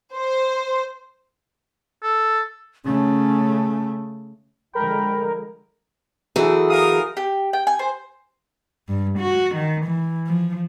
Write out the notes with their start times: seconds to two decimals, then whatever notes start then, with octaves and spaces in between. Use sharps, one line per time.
0.16 C5
2.03 A4
2.85 C#3 A3 C#4
4.75 D3 F3 G#3 A#4 G5 B5
6.36 E3 F#3 A3 E4 G#4
6.70 A#4 F5 D#6
7.17 G4
7.53 G5
7.67 G#5
7.79 C5
8.89 G2
9.19 F#4
9.55 D#3
9.86 E3
10.27 F3